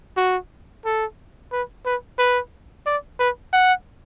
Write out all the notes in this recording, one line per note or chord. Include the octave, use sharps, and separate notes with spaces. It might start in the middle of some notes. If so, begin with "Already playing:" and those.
F#4
A4
B4
B4
B4
D5
B4
F#5